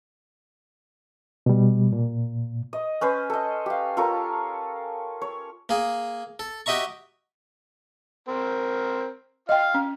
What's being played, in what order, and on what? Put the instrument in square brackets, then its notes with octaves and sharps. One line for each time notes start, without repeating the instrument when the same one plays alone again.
[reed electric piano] B2 G3
A#2
[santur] D#5
C#4 B4 C5
A4 D#5
G4 F5
F4 A4 A#4 C#5
C#5
[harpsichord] A#3 G#4
A4
F#4 G4 D#5 E5 A#5 C#6
[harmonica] C4 A#4
[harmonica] F4 F5 [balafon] D#5 G5
[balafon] C#4